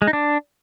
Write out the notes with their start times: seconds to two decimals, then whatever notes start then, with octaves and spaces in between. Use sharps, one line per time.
0.02 G#3
0.07 D#4
0.13 D4